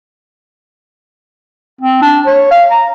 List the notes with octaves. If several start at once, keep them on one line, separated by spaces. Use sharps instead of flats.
C4
D4
C#5
F5
A#5